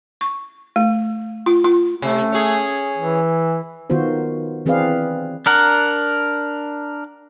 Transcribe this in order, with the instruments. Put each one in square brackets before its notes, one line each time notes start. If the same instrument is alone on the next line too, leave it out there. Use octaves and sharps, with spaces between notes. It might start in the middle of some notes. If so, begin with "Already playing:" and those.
[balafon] C#6
A3
F4
F4
[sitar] C3 [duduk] A3
[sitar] C#4 G#4
[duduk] E3
[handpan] D#3 B3 F4 F#4 C5
E3 C4 G#4 B4 D5 F5
[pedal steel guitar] D4 A#4 F#5